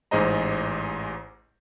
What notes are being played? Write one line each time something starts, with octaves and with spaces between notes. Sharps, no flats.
A1 G#2 G#4 C5 D#5 A#5